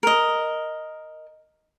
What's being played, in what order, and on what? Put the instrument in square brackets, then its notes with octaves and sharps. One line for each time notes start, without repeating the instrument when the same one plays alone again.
[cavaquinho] A#4 D#5